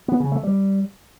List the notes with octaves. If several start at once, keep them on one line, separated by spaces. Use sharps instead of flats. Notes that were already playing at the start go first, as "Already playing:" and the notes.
B3
C#3
A3
G3